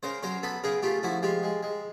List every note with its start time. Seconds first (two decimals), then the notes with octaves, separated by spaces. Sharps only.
0.03 C#3 A#4 C5
0.23 F#3 A#4 C5
0.43 B3 A4 B4
0.64 C#3 G#4 A#4
0.83 A3 F4 G4
1.03 F3 E4 F#4
1.23 G#3 F4 G4
1.43 G#3
1.63 G#3